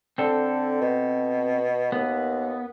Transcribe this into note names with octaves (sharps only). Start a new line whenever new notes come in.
D3 C4 A4
B2
D#2 B3